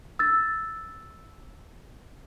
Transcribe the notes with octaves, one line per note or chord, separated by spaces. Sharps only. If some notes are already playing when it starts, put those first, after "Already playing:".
E6 A6